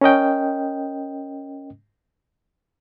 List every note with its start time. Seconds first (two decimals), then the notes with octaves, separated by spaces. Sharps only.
0.01 C#4 A#4 D#5 G5